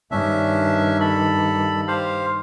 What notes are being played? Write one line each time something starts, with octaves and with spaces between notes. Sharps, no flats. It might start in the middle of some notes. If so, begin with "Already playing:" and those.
G2 D#3 C#4 D4 E5
A4 B5
G4 C5 F5